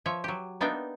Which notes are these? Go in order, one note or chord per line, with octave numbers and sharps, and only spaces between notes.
F3 C#5 E5
F#3 G4
A#3 B3 D4 D#4 E5 G5